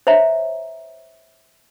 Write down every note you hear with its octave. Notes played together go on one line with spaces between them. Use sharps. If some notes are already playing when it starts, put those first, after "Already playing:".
C5 C#5 E5 A#5